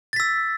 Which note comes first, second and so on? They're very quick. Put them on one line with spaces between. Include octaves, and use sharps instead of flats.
A6 B6 E6